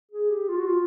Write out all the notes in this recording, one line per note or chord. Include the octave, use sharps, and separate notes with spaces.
G#4
G4
F4
F#4
F4